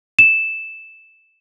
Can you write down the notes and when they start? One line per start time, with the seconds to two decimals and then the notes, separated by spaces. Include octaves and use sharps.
0.19 E7